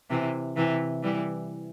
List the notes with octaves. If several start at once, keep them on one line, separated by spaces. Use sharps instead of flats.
C3 E3
C3 E3
E3 G3